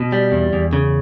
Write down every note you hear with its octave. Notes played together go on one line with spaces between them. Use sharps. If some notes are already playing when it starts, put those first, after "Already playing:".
Already playing: B2
G3
E2
E2
C#3